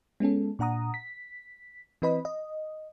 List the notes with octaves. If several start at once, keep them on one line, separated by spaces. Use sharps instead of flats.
G#3 B3 C#4 A4
A#2 D4 F#5 A#5 D#6
B6
E3 C4 B4 D#5 B5
D#5